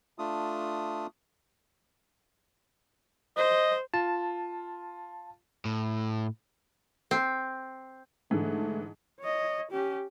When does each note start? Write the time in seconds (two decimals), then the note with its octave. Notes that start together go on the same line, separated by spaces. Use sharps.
0.19 A3 D4 F4 D#6
3.37 C5 D#5
3.94 F4 A5
5.65 A2
7.11 C4
8.31 G#2 D3 E3 A3
9.20 C#5 D#5
9.71 C#4 G4